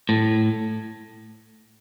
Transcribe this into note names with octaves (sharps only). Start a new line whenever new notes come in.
A2